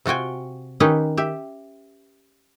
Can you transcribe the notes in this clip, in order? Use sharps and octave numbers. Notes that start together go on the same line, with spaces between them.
C3 F4 F#4 G5 G#5
D#3 C#4 D#4 G4 B4
G4 E5